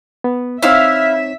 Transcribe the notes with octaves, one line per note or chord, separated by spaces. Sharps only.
B3
C4 D#4 E4 C#5 E5 F5